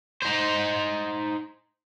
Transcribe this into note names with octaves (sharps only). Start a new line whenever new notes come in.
D#4 C5